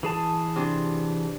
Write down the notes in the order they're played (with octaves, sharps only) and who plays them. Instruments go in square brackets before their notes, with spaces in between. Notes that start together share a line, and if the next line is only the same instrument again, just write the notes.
[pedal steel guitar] E3 G#4 A5
[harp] C3 D4